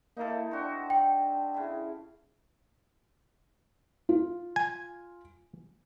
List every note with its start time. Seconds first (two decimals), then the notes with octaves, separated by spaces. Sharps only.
0.17 A#3 D#4 E4 A4
0.51 C4 D4 F#4
0.90 G5
1.54 C#3 E4
4.09 F4
4.56 G#5